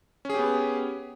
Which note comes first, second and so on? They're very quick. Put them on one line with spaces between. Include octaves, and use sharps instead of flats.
C#4 G#4 G4 B3